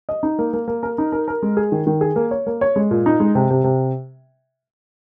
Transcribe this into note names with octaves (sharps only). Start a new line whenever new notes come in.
D#5
D#4
A#3
A#3
A#3
A#4
D#4
A#4
A#4
G#3
G#4
D#3
D#3
G#4
A#3
C#5
A#3
C#5
G#3
A#2
D#4
G#3
C3
C3
C3